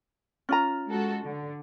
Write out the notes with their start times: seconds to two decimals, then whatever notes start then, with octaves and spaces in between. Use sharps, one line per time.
0.49 C#4 F4 A#5
0.88 G#3 F#4 A4
1.24 D3